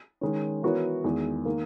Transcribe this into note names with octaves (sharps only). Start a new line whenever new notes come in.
D#3 G#3 C#4
E3 B3 F#4 A#4 C#5
E2 D#3 G#3
D#3 A#3